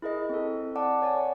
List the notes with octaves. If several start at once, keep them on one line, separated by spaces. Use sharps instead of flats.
E4 G#4 A#4 D#5
C4 A4
D5 F#5 A5 D6
C#5 D5 F#5 G#5